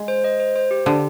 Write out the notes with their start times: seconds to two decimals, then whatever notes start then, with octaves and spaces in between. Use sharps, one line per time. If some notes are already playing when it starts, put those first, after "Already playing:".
Already playing: G#3
0.08 C5
0.24 D#5
0.40 C5
0.56 C5
0.71 G4
0.86 D3 G4